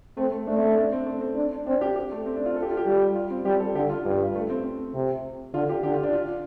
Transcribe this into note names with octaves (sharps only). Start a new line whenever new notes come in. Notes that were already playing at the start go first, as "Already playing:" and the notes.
A3 C4
A3
A3 D4
C4
D4
D4
C4
A3
C4
D4
C4 D4
G4
G4
A3
C4
D4
F4
A4
G4
F4
G4
G3
F4
C4
G3 G4
A4
D3 G4
F4
G2
A3
C4
C4
C3
D3 F4
G4
D3 G4
F4
D4
F4